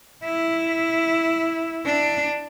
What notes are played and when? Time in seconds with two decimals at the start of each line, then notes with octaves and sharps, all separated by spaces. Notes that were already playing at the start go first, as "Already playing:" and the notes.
0.24 E4
1.86 D4